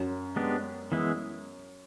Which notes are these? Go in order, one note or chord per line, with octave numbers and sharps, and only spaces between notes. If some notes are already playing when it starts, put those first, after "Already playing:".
Already playing: F#2 F#3
G#3 B3 D4 G4
E3 G#3 B3 E4